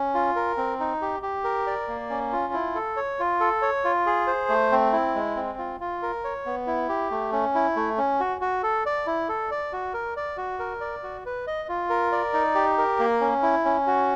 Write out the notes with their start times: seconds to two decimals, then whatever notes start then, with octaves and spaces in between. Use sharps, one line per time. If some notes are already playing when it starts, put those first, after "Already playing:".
Already playing: C#4
0.14 F4
0.36 A#4
0.57 C4
0.80 D#4
1.02 G4
1.22 G4
1.44 A#4
1.67 D5
1.88 A#3
2.10 C#4
2.32 F4
2.53 E4
2.75 A4
2.96 C#5
3.19 F4
3.40 A4
3.62 C#5
3.84 F4
4.06 G#4
4.27 C5
4.49 A3
4.72 C4
4.93 E4
5.15 G#3
5.36 C4
5.58 F4
5.80 F4
6.02 A#4
6.24 C#5
6.46 B3
6.67 E4
6.89 G4
7.11 A3
7.32 C#4
7.55 E4
7.76 A3
7.98 C#4
8.20 F#4
8.41 F#4
8.63 A4
8.86 D5
9.07 E4
9.29 A4
9.51 D5
9.73 F#4
9.94 A#4
10.17 D5
10.37 F#4
10.59 A#4
10.81 D5
11.03 F#4
11.25 B4
11.47 D#5
11.69 F4
11.90 A#4
12.12 D5
12.33 D#4
12.55 G4
12.78 A#4
12.99 A#3
13.21 C#4
13.42 E4
13.65 C#4
13.87 F#4